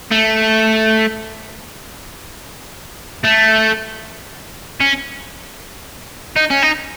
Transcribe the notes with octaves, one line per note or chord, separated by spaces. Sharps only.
A3
A3
C#4
D#4
C#4
D#4